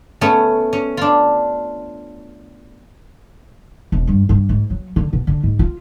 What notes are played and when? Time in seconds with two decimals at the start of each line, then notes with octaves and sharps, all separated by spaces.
0.21 A3 B3 C#4
0.73 C#4
0.97 D4 F4
3.92 E1
4.07 G2
4.29 G2
4.49 G#2
4.70 F#3
4.96 D3
5.13 B2
5.27 D3
5.43 G#2
5.59 F4